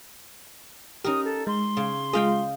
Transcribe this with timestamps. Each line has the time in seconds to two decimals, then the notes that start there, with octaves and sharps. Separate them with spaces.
1.04 C#4 D#4 G4 A#4 D#6
1.24 A4
1.47 G#3 C6
1.77 C#3
2.13 G#3 F4 G#4 D#5 F5 G5